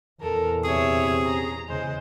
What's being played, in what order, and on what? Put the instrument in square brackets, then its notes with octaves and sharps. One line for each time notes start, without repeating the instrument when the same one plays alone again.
[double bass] E2 A#2 [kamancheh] A4 A#4
[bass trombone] C3 [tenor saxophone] G#4 [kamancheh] C#5 E5
[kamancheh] C#4 A#5
[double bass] E2 C#3 [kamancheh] G#3 C5